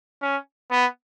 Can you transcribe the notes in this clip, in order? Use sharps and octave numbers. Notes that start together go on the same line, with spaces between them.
C#4
B3